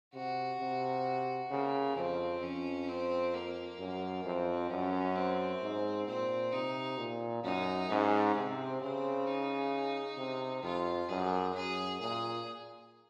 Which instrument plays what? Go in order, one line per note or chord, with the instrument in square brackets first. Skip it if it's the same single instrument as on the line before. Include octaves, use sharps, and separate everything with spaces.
[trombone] C3 [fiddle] F#4
[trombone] C3
[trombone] C#3 [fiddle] A#3
[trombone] F2 [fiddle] C4
[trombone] F2 [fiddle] C#4
[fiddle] C4
A#3
[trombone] F#2
[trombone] F2 [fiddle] C4
[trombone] F#2 [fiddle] C#4
[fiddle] C4
[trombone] G#2
[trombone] A#2 [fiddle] C4
[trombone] C3 [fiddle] D#4
[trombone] A#2
[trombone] F#2 [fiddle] D#4
[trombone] G#2 [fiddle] C#4
[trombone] C3 [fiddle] C4
[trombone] C#3 [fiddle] C4
[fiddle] D#4
[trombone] C3
[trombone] F2 [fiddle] F4
[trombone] F#2 [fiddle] G#4
[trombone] F#2 [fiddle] G#4
[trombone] A#2 [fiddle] G#4